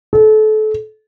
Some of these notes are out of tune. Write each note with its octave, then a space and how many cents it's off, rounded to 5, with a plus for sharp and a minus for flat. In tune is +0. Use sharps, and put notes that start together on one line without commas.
A4 -30